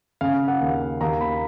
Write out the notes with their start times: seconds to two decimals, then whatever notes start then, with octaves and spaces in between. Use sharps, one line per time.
0.21 C#3 F5
0.48 F#5
0.61 D#2
1.01 D#2 A#5
1.21 B5